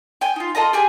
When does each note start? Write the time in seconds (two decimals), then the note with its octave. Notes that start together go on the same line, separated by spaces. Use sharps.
0.21 G5 G#5
0.36 D#4 F4
0.55 F4 A4 D#5 A#5
0.73 G4 G#4 G#5